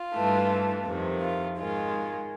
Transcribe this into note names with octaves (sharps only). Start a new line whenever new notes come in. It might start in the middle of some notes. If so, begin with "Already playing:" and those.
Already playing: F4
G2 E3 A3
F2 C3 D#3
F4
G#2 D#3 G#3 F4